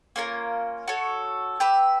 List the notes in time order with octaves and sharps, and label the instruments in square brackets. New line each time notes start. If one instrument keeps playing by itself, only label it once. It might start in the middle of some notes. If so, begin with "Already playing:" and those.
[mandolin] A#3 C#4 F4 A#4
F#4 A4 C#5
G4 B4 E5